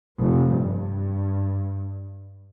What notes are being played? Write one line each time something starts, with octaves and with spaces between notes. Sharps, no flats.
F1
G2